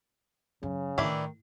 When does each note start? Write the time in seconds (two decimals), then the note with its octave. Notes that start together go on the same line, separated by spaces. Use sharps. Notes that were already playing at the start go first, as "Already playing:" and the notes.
0.63 F#2 C#3
0.98 A2 D#3 E3 D4 E4